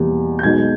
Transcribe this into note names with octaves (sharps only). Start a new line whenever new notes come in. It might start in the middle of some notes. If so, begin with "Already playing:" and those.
Already playing: E2 B2 G3 A#3
G6
B1 B2 G#3 G#6